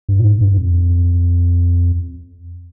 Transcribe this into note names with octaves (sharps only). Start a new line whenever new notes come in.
G2
A#2
G#2
G2
G2
F2